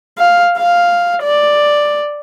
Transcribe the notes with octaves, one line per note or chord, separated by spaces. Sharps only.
F5
F5
D5